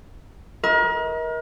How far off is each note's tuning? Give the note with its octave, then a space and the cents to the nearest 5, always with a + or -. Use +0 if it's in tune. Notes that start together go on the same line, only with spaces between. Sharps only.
A#4 +35 D#5 +40